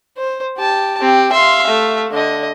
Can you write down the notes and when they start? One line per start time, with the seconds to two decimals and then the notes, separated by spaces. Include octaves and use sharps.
0.17 C5
0.57 G4 A5
1.00 C4 G4
1.32 E5 F5 C6
1.68 A3
2.13 D3 D#5